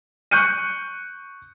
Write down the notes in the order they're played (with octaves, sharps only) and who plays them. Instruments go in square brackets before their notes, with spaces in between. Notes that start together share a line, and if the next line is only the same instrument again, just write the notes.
[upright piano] C#6 F#6 G6 C#7 D#7